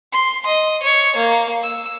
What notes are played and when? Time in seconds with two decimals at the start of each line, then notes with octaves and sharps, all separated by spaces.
0.12 C6
0.46 D#5
0.82 C#5
1.16 A#3
1.63 E6